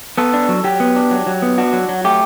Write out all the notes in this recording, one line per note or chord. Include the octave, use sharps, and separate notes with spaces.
B3 A4
D4
F#3
F#3 G4
B3
D4
F#3
F#3
B3
D4 F#4
F#3
F#3
A3 G4